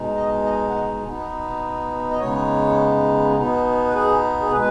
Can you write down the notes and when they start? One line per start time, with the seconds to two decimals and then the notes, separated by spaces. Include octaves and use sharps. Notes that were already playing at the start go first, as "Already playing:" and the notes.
Already playing: B2 G#3 D#4
0.16 D#5
0.45 D#5
0.69 F#5
0.75 D#5
1.04 B2 B3 D#4
2.11 D#5
2.19 C#3 G#3 B3 D#4 C#5
3.35 B2 B3 D#4
3.88 B4
3.94 G#4
4.41 G#4
4.51 B2 G#3 B4